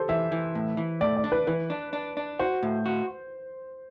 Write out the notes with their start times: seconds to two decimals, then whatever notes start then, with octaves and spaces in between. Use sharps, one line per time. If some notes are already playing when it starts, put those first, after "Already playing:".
Already playing: G4 A4 C5
0.09 E3 E5
0.32 E3
0.55 A2
0.77 E3
1.01 A2 D5
1.16 D5
1.24 D4
1.32 B4
1.47 E3 B4
1.70 D4
1.93 D4
2.17 D4
2.39 F#4 C5
2.63 A2
2.86 F#4